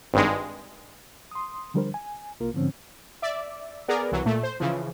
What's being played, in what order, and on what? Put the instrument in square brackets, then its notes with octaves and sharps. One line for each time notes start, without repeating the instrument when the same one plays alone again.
[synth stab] G#1 G2 G#3
[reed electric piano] C6 D#6
D3 F3 G3 D4 A#4 C5
G#5
C2 A#3 F4 A#4
G#2 D3 F3 C4 C#4
[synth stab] D5 E5
B3 G#4 A#4 D5
C2 E3 F#3
A#2 A3
C5
C#3 E3 F3